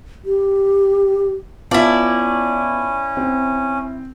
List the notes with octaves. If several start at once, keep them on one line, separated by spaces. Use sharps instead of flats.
G4
B3 C#4 E4 F4 D5 A5
C4